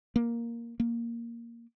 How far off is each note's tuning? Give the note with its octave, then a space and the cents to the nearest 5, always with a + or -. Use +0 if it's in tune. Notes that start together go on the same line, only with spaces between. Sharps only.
A#3 +5
A#3 +0